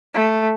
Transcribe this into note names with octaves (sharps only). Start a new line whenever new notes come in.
A3